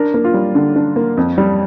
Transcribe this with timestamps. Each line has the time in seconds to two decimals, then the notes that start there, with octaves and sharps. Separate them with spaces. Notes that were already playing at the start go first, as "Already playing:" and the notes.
Already playing: D4 A#4
0.14 A#3
0.24 F4
0.34 G3
0.55 D3
0.75 D4
0.96 A#3
1.17 F2
1.38 G3